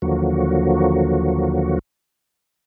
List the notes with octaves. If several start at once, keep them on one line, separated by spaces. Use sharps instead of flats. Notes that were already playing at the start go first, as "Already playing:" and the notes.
D#2 D3 F3 F#3 A#3 F#4